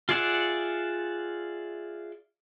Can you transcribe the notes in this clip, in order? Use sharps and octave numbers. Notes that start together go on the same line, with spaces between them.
F4 G#4 D5 E5 F#5